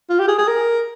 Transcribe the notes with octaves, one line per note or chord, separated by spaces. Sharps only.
F4
G4
G#4
G#4
A#4